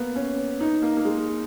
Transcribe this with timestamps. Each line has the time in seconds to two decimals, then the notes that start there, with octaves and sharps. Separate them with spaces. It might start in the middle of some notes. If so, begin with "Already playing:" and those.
Already playing: A#3 B3
0.16 C#4
0.60 D#4
0.82 A#3
0.97 A#3
1.05 G#3